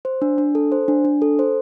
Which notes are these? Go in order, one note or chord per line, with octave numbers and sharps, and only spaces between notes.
C5
D4
D4
A4
C5
D4
D4
A4
C5